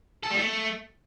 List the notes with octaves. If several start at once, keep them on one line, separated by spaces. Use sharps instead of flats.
A4
G3
A3